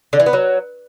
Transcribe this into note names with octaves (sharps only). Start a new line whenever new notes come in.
D3
E3
B3
F#3